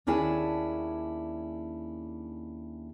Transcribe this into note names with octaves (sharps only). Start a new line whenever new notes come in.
D#2 C#4 D4 E4 G#4 A5